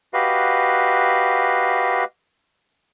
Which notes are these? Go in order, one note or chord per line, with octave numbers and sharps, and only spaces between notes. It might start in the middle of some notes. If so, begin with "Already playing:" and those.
F#4 G4 B4 D#5 F5